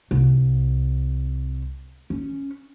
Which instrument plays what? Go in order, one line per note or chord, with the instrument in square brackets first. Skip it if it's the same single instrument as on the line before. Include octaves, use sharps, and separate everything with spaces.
[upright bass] C2
C#4